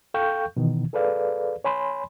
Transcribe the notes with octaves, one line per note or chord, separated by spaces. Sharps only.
A4 F5 G5 C#6 G6
B2 D#3 E3
G#4 A4 B4 D5 F5
C#5 G#5 B5 C6